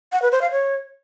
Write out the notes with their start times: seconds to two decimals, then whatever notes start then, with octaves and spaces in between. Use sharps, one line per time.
0.12 F#5
0.22 B4
0.32 C5
0.42 F5
0.51 C#5